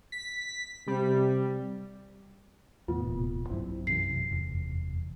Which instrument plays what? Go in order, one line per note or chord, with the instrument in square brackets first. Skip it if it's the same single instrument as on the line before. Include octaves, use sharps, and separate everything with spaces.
[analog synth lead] B6
[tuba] C3 [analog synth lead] G3
[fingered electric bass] E2 [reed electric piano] A2 C3 B3 [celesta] F4
[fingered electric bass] D1 A#2
[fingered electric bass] B1 G2 F#3 [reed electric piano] C4 E4
[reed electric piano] F#2 C3 E3 [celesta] C7
[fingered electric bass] F1 E2